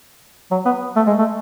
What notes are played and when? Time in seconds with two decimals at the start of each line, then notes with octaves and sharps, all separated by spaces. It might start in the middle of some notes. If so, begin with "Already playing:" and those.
0.51 F#3
0.65 B3
0.96 A3
1.07 G#3
1.19 A3